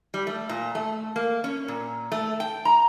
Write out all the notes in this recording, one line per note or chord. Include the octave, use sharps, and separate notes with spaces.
G3
A3
A#2
A3
A#3
C#4
A#2
A3
G5
A#5